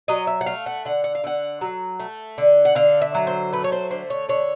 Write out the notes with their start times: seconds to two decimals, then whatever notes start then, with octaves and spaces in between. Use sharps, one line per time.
0.08 F#3 D#5
0.27 E5
0.41 F#5
0.46 A3 F5
0.66 F#5
0.85 D3 F#5
1.04 F#5
1.15 F5
1.24 D3 F#5
1.61 F#3
2.00 A3
2.38 D3
2.65 F#5
2.75 D3 F5
3.01 E5
3.14 F#3
3.27 C5
3.53 A3 B4
3.64 C#5
3.72 C5
3.90 D3 C5
4.10 C#5
4.29 D3 C#5